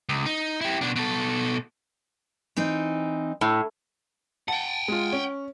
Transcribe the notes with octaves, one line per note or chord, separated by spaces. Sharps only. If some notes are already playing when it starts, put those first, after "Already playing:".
C#2
D#4
E4 G4
B2 D4
B2 A4
E3 C4 D#4
A2
F#5 G5 A5
G#3 F4
C#4